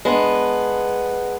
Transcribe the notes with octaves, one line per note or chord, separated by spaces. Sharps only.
G#3 B3 D4